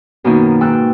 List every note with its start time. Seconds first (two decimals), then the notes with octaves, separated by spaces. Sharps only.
0.24 F#2 B2 D#3 A#3 D#4
0.61 G#2 G5 E6 F#6